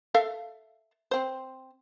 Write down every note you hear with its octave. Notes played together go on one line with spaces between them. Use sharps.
A4 E5 F5
C4 C5